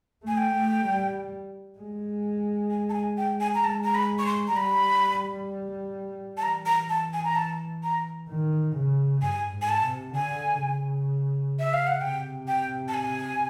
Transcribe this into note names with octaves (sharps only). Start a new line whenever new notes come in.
A3 G#5
G5
A3
G3
G#3
G#5
A5
G#5
G5
G#5
A#5
G#3 A5
A#5
B5
C#6
C6
A#5
G3 B5
A5
E3 A#5
A#5
A5
G#5
A#5
A5
A#5
D#3
C#3
G2 G#5
G#2
G#5
A5
C3
D3 G#5
C#3
E5
F5
F#5
C3 G5
G5
A5
G#5